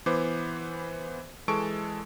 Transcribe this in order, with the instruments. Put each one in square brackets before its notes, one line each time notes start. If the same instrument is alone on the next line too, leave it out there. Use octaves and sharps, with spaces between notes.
[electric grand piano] E3 B3 C5 D6
E3 G#3 A4 A5 C#6 D7